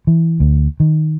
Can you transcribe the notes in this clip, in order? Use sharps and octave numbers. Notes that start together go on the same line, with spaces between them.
E3
D2
D#3